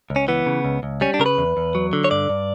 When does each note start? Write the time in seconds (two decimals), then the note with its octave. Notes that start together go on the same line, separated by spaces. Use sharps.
0.10 C#2
0.16 C#4
0.28 E3 B3
0.46 C#3
0.65 C#2
0.83 C#2
1.01 G3 C#4
1.14 D4
1.19 C#3 A#4
1.26 B4
1.38 E2
1.57 E2
1.75 F#3
1.93 D3
2.04 C#5
2.11 G2 D5
2.29 G2